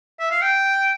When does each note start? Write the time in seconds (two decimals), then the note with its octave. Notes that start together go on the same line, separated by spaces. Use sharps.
0.19 E5
0.31 F5
0.42 G5